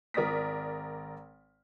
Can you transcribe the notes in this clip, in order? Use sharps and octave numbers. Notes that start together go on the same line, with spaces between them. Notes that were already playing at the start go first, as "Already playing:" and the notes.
G#1 A#4 D5 D#6 A#6 B6